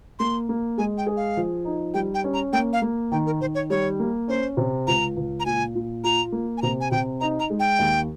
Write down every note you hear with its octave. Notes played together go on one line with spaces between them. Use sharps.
A#3 C6
A#3
G#3 G#5
G5
G#4
F5
F3
D#4
G3 G5
G5
C#4
A#5
A#3 G5
F5
A#3
D#3 G5
A#4
D#3 C5
C#5
G3 C#5
A#3
C#4 C5
C3
C#2 A#5
C#2
A#5
A#2 G#5
A#2
F4 A#5
A#3
G#5
C3 A#5
G#5
C3 G5
D#4 A#5
A#5
G#3
G5
D#2